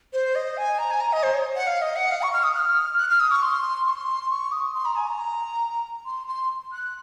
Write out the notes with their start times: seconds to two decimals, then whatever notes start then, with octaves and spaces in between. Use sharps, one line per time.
0.13 C5
0.35 D#5
0.57 G#5
0.78 A#5
0.90 G#5
1.00 A#5
1.12 D#5
1.23 C5
1.34 C#5
1.56 F#5
1.66 F5
1.81 D#5
1.96 F#5
2.11 F5
2.22 C#6
2.33 F6
2.43 D#6
2.54 F#6
2.59 F6
2.98 F#6
3.09 F6
3.20 D#6
3.31 C#6
3.42 C6
3.87 C#6
3.90 C6
4.30 C#6
4.52 D#6
4.74 C6
4.85 A#5
4.95 G#5
5.06 A#5
6.05 C6
6.27 C6
6.72 F#6